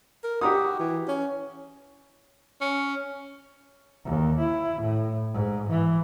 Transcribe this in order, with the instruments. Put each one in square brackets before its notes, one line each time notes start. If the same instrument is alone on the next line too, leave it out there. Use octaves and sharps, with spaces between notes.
[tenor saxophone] A#4
[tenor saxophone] F#4 [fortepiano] G4 A#5 D#6
[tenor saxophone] E3
C#4
C#4
[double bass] D#2
E4
A2
G#2
E3